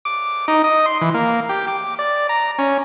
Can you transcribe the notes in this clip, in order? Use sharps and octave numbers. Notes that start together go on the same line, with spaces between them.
D6
D#4
D#5
C6
E3
A#3
G4
D6
D5
A#5
C#4